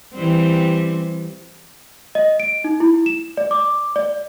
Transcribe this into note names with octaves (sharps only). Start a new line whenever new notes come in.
E3 G3 C4
D#5
D7
D#4
E4
E7
D5
D6
D5